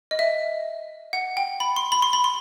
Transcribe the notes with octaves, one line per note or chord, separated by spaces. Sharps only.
D#5
E5
F#5
G5
B5
C6
B5
C6
B5
C6